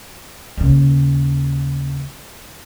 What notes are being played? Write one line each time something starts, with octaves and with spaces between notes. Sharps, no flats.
D#2 C#3